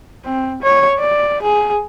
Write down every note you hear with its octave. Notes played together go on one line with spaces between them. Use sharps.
C4
C#5
D5
G#4